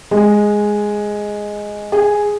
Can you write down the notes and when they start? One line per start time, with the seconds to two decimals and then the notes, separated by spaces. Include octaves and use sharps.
0.11 G#3
1.92 G#4